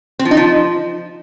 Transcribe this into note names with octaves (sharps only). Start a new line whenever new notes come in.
C4
F3
D#4
F3